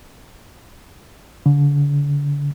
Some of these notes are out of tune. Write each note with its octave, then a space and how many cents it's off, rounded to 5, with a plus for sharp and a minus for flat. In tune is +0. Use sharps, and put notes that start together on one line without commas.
D3 -35